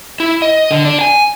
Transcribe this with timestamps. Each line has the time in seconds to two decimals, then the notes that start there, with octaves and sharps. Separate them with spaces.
0.20 E4
0.42 D#5
0.71 D3
0.85 D4
1.01 G#5